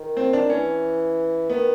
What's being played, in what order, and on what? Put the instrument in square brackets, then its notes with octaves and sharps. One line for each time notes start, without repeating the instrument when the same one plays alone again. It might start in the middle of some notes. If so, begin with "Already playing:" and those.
Already playing: [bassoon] D#3
[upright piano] C4
D4
[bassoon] E3 [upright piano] C#4
[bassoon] D#3 [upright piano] B3